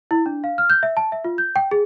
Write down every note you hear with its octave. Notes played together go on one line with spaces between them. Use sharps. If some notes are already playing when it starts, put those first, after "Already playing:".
E4
D4
F5
F6
G6
E5
A5
E5
F4
G6
G5
G#4